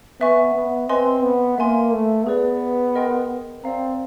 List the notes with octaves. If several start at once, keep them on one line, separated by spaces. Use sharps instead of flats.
B3 B4 E5 G#5 C#6
B3
C4 B4 D#5 G#5 C6
B3
A#3 E5 G#5 C6
A3
B3 G#4 B4 D5
A#4 D#5 G5 C6
C4 D5 F5 A#5